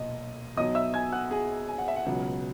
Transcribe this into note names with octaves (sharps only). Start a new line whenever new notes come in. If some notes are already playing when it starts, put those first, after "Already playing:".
Already playing: B1 A#2 D#5
B1 B2 F#3 D#5 D#6
E5 E6
G#5 G#6
F#5 F#6
G#4 G#5
G#5
F#5
E5
F#5
C#2 B2 F#3